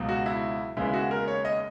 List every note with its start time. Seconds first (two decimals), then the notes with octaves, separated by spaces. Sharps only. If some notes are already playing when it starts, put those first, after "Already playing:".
Already playing: C#2 B2 F#3
0.09 F#4
0.26 E4
0.77 D#2 C#3 G#3 B3 E4
0.94 F#4
1.11 A#4
1.28 C#5
1.45 D#5